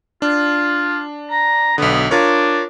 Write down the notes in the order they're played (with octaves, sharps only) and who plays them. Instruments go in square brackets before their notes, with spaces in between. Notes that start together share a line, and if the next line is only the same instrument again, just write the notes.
[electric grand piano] D4 [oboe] F4
[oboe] A#5
[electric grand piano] B1 D3 [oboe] B3
[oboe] D4 [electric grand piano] F4 A#4 C#5